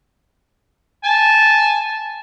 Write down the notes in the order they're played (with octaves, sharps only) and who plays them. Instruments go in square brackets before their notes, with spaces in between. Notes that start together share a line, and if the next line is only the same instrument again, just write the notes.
[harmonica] G#5 A5